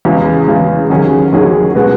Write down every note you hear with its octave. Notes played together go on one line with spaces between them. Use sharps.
E2 C#3 G#3
E2 C#3 G#3
D#2 D#3 F#3 C#4 G#4
D#2 D#3 F#3 C#4 G#4
B2 G#3 B3 F#4